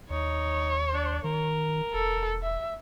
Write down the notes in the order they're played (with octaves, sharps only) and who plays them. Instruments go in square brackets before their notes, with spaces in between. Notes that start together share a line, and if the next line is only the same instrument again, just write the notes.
[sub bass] D#2 [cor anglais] D#4 [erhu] C#5
[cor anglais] D4
[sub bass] D#3 [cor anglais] A#4
[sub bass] E1 [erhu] A4
[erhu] E5